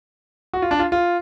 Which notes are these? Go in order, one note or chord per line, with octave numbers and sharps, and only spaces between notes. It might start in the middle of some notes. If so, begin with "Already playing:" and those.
F#4
F4
D4
F4
F4